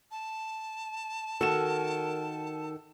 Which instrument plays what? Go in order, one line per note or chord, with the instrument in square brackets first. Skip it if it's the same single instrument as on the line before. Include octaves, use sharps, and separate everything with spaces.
[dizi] A5
[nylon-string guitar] D#3 F#4 [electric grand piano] A4 E7 [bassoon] A#4